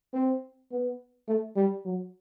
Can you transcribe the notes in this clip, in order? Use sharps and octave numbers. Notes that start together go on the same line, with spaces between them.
C4
B3
A3
G3
F#3